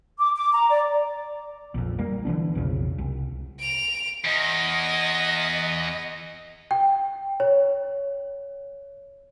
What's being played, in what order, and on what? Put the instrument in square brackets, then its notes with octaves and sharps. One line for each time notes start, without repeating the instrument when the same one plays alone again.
[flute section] D6
D6
A#5
D5
[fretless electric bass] A#1 F2
G3 A#3
D3 E3 B3 D4
B1 F2 C#3
C2
[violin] D7 F7
[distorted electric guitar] E2 [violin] D#5
[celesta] G5
C#5